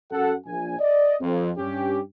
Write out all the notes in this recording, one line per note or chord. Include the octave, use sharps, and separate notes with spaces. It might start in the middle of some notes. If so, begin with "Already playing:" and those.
F#2 A4 F#5
A#1 G#5
D5 D#5
F2
G2 C#4 G4